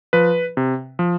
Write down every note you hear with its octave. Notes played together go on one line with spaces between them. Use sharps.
F3 B4
C3
F3